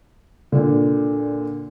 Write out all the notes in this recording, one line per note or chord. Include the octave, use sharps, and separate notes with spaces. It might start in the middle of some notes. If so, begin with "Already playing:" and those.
A#2 D3